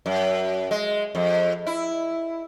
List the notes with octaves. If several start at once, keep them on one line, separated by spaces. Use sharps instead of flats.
F#2
G#3
F2
E4